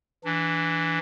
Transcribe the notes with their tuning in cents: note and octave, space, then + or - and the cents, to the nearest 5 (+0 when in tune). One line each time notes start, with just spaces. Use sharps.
E3 +0 D4 +0